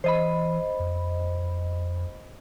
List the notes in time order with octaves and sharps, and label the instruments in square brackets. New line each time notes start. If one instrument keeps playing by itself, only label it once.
[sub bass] E3 [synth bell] C5 D#5 B5
[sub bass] F2